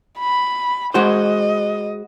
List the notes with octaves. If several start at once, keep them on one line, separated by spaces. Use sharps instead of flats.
B5
G#3 F#4 C5 D#5